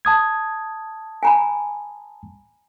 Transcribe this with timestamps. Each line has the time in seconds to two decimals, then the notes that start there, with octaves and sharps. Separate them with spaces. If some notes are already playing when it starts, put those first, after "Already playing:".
0.05 A5 D#6 G#6
1.23 G#5 A#5 B5